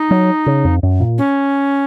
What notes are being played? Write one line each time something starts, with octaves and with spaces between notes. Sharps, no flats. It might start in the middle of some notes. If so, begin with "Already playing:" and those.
Already playing: D#4
F#3
C#3
F2
F#2
A#2
C#4